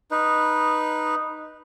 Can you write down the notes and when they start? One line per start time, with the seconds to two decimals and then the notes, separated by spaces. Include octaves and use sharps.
0.11 D#4 B4